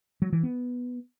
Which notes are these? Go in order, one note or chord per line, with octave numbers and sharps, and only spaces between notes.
F#3
E3
B3